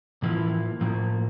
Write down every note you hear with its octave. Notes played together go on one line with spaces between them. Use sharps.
A2 E3 F3 A#3 E4
A2 F3 A#3